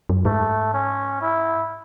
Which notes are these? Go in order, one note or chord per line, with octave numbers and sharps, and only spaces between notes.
F#2
G#2 A3
C#4
E4